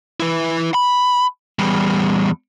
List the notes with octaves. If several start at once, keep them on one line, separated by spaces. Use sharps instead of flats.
E4 B4
B5
E2 G3